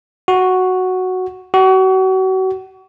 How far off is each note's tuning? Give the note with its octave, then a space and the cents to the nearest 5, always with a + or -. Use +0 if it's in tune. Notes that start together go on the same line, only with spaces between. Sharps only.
F#4 +0
F#4 +35